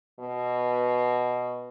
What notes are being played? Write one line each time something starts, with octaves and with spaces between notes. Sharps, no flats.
B2